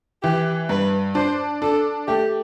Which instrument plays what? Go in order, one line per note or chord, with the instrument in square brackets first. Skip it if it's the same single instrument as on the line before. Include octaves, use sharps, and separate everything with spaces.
[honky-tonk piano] E3 [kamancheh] G4
[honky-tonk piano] G2 [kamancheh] B4
[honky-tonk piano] D4 [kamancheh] C5
[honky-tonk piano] D4 [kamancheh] A4
[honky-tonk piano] A3 [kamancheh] G4